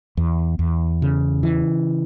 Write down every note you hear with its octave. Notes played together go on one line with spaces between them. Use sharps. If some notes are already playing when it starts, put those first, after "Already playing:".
E2
E2
C#3
E3